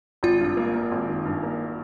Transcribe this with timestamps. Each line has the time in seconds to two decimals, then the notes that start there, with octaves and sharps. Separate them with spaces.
0.23 G#1 F4
0.41 G2
0.57 A#3
0.74 A#3
0.92 G#1
1.09 D#3
1.25 G2
1.43 A#3